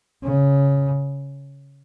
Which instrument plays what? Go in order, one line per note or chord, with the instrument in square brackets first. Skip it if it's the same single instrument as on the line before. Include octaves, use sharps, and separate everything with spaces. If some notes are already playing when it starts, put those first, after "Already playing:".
[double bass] C#3